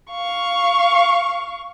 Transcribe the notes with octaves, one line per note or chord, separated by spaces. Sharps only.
F5 C#6